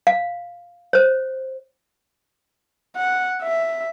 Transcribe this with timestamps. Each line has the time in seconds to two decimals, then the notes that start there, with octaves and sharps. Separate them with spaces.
0.07 F5
0.93 C5 C#5
2.96 F#5
3.43 E5